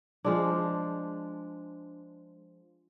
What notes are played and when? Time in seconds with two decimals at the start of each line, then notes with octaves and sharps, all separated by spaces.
0.24 F3 G#3 D4